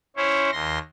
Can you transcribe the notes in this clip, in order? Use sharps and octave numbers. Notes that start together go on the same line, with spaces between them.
C#4 E4 C5 C#5
D#2 C6 A#6